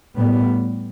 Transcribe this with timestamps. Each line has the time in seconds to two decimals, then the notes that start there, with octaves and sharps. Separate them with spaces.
0.15 A2 G3 B3